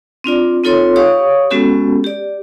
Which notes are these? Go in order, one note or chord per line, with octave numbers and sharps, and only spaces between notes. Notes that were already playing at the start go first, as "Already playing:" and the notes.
C4 D4 F4 D5
C4 D#4 F4 A4 C#5 C6
G4 C#5 F5 C#6 D#6
G#3 B3 C#4 F#4 G4 A4
G4 D5